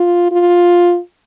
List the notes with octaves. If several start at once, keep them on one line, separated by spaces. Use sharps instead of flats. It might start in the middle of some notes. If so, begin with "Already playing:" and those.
Already playing: F4
F4